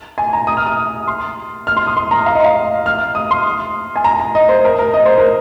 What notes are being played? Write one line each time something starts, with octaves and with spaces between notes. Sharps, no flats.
G#5
A#5
D#6
F6
D#6
C6
F6
C6
D#6
C6
A#5
F5
D#5
F5
F6
D#6
C6
G#5
A#5
A#5
D#5
C5
A#4
A#4
D#5
C5
A#4